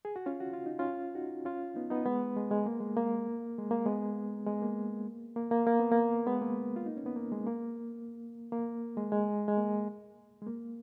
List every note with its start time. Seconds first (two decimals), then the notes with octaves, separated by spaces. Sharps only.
0.05 G#4
0.16 F#4
0.26 C#4 F4
0.40 F#4
0.53 F4
0.66 D#4
0.79 C#4 F4
1.15 D#4 F#4
1.45 C#4 F4
1.75 B3 D#4
1.90 B3 D#4
2.06 G#3 B3
2.36 G#3
2.51 G#3
2.66 A#3
2.80 G#3
2.97 A#3
3.58 G#3
3.71 A#3
3.86 G#3 B3
4.46 G#3 B3
4.62 A#3
5.36 A#3
5.51 A#3
5.67 A#3
5.79 B3
5.92 A#3
6.26 G#3 B3
6.41 A#3
6.76 F4
6.86 D#4
6.97 C#4
7.06 B3
7.16 A#3
7.32 G#3
7.46 A#3
8.52 A#3
8.97 G#3
9.12 G#3
9.48 G#3
9.57 A#3
10.42 G#3
10.47 A#3